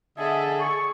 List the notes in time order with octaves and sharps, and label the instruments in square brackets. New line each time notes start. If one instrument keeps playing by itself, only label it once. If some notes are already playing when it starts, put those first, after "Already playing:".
[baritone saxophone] D3 [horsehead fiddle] G#4 A4 [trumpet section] D#5 E5
[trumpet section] C#6